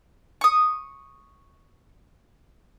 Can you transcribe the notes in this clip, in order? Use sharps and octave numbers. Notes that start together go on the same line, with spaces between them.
C#6 D#6